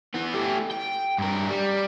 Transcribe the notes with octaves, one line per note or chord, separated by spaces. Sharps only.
E3 B3
A3 G4
G5
G2 A#4
G3